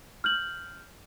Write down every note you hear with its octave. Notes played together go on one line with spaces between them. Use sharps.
F6 G6 F#7